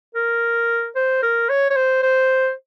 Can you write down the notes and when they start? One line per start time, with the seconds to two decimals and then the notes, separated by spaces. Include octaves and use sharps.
0.15 A#4
0.95 C5
1.22 A#4
1.49 C#5
1.70 C#5
1.76 C5
2.03 C5